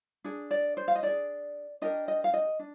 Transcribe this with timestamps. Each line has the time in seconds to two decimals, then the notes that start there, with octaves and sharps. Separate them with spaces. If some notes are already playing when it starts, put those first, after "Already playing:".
0.24 D4 G#4
0.51 D5
0.77 C5
0.88 F5
0.95 D#5
1.03 D4 G#4 D5
1.82 D4 G4 A#4 D#5
2.08 D#5
2.24 F5
2.34 D#5
2.59 D4